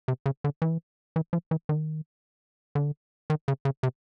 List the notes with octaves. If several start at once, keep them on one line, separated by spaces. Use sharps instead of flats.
C3
C#3
D3
E3
E3
F3
E3
D#3
D3
D#3
C#3
C#3
C3